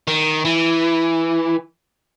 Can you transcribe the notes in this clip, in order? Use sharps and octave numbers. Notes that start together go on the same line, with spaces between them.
D#3
E3